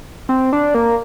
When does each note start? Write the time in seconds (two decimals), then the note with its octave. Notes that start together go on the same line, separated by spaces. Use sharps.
0.29 C4
0.53 D4
0.74 A#3